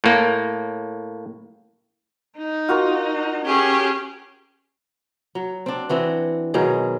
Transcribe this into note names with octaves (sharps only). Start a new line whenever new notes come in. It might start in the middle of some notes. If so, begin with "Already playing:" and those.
A2 A#3
D#4
F4 F#4 A#4
C#4 G4 G#4
F#3
C4 D4
E3 C4 F#4
B2 D#3 F#3 G#4